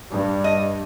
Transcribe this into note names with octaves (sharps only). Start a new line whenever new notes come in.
G2
D#5